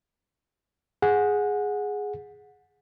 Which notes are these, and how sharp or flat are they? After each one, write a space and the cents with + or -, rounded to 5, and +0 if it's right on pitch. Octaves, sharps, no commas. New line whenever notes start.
G#4 +0 F#5 -20